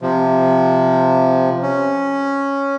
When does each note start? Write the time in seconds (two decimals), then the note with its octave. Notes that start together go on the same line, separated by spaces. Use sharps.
0.01 C3 F3
1.63 C#4